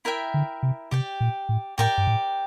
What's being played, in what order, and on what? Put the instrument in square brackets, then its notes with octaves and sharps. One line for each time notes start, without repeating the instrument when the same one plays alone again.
[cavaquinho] E4 A#4 E5 G5
[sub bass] D3
C3
[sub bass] C3 [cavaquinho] G4 D5 G5
[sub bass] A#2
A2
[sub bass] A2 [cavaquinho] G4 A#4 D5 G5
[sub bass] G2
A2